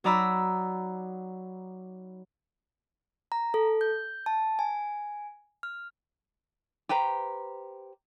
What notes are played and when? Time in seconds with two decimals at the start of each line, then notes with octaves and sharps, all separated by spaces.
0.04 F#3 D#4 D5 A#5 B5 E6
3.32 A#5
3.54 A4
3.81 G6
4.26 A5
4.59 G#5
5.63 F6
6.89 G4 B4 C5 A#5